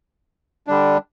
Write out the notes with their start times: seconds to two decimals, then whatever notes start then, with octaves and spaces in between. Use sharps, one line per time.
0.67 D3 G3 D4